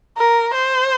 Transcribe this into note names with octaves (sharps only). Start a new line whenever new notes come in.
A#4
C5